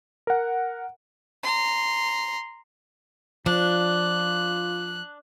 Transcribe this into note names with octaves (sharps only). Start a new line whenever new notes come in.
A#4 F#5
A#5 C6
F3 D4 F4 F#6